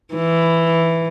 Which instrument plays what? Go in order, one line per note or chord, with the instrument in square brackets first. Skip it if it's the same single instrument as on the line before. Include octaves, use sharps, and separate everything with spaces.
[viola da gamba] E3